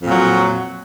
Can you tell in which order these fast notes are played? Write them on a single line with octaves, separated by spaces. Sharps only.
F2 A#2 F#3